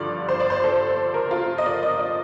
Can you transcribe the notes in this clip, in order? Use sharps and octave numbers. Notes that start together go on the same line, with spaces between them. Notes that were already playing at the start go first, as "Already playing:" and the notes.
Already playing: G2 D3 F3 D5
C5
D5
C5
A4
A#4
F4
D#5
D5
D#5
D5